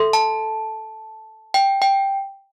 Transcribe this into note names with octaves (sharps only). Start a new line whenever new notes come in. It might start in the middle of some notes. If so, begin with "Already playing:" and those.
Already playing: A4 E5 C6
A5
G5
G5